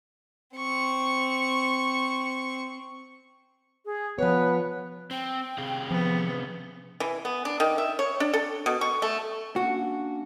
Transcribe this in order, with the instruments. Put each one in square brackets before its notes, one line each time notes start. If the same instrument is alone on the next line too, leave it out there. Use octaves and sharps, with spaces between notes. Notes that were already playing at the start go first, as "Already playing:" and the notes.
[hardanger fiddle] C4 C#6
[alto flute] G#4
[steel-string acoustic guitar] F3 C#5 [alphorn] B3 [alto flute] B4
[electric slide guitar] C4 [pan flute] G5
[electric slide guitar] C3 G#4 F5
[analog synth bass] F3 [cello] B3
[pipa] E3
B3
D4
D#3
E5
C#5
D4
A4
B2
C#6
A3
[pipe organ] A#3 C#4 D4 [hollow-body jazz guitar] F#4